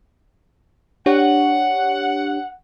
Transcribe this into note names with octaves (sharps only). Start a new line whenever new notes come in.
D4 G4 C#5 F#5